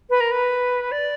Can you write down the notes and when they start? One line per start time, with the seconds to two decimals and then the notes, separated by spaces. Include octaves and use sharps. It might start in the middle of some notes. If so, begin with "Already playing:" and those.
0.10 B4
0.20 A#4
0.31 B4
0.92 D5